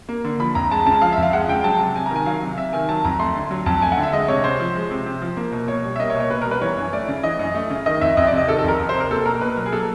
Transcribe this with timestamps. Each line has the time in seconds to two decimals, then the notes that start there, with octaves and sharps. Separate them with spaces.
0.09 A#3
0.25 D3
0.40 F3 B5
0.55 F2 A#5
0.71 G#3 A5
0.86 C#3 A5
1.02 F3 F5
1.12 E5
1.17 F2
1.23 F5
1.33 G#3 F#5
1.49 C#3 G5
1.64 F#3 A5
1.80 C3
1.95 C3 G#5
2.06 A#5
2.11 D#3 G#5
2.26 F#3 F5
2.42 C3
2.58 C3 E5
2.73 D#3 G#5
2.89 F#3 A5
3.05 F2 A#5
3.19 A3 C6
3.36 D3
3.51 F#3
3.66 F2 A5
3.82 A3 G#5
3.92 F#5
3.97 D3
4.03 E5
4.12 G#3 D#5
4.28 C3 C#5
4.44 C3 C5
4.60 F3
4.75 G#3
4.91 C3
5.06 C3
5.22 F3
5.37 A#3
5.52 B2
5.68 B2 C#5
5.84 G3
5.96 E5
5.99 A#3 D#5
6.10 C#5
6.15 B2
6.20 C#5
6.30 B2 B4
6.41 A#4
6.46 G3
6.51 B4
6.61 E3 C#5
6.77 F#2
6.93 A3 D5
7.08 C#3
7.23 E3 D#5
7.39 F#2
7.55 A3
7.70 C#3
7.86 D#3 D#5
8.01 F2 E5
8.17 F2 D#5
8.27 D5
8.33 C3
8.38 D#5
8.48 D#3 A4
8.59 A4
8.64 F2 A#4
8.79 F2
8.89 C5
8.94 C3
9.00 A#4
9.11 A#3 A4
9.25 B2 A#4
9.41 B2 B4
9.57 F#3 A#4
9.66 G#4
9.72 A#3 A4